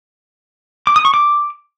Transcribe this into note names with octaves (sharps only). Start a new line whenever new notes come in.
D6
D#6
C#6
D6